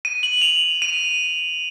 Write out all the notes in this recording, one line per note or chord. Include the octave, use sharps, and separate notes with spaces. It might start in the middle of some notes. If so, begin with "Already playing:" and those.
D#7
F#7
F7
D#7